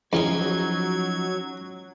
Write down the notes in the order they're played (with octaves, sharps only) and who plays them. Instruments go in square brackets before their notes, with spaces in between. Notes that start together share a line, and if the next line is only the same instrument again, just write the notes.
[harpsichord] E2 G#4 [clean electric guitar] F3 C#4 D#4 [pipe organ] F#3 G#6